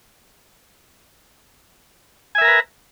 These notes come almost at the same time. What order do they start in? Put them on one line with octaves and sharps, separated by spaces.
G#5 E5 A#4 A#5 B4